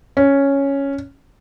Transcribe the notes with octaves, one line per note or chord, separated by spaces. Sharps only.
C#4